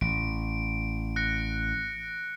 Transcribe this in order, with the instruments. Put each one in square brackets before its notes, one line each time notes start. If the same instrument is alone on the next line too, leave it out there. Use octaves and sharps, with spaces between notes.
[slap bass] A1 [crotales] D7
[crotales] F#6 A#6 C#7